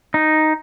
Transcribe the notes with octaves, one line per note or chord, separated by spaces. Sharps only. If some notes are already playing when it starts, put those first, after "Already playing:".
D#4